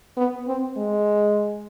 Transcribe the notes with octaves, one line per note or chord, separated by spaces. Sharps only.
B3
C4
G#3